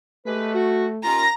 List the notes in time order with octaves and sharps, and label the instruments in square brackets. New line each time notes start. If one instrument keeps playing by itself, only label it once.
[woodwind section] G#3 G4 B4 [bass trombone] A3
[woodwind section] F#4
[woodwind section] D#2 C#4 F4 [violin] A#5 A#6